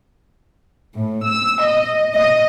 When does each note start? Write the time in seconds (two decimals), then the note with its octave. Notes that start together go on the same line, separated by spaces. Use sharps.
0.95 A2
1.25 E6
1.63 D#5
2.14 D#5